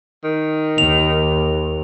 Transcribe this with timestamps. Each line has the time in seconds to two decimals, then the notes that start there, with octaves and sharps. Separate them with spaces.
0.24 D#3
0.78 D#2 F7